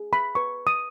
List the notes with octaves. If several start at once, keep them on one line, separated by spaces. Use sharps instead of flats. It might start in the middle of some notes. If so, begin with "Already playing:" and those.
Already playing: G#4
B5
B4 C#6
D#6